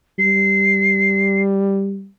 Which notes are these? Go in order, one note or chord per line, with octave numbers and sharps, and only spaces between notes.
G3 C7